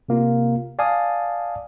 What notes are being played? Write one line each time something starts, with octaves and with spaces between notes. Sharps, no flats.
C3 A#3 F4
D5 F5 G#5 A5 D#6